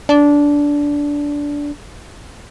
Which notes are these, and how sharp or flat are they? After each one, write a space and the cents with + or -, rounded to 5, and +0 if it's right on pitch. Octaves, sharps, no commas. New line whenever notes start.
D4 -15